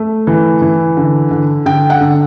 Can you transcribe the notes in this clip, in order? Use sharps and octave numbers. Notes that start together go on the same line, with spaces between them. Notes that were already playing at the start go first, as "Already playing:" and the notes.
Already playing: A3
E3
E3
D3
D3
D3 G5
F#5
D3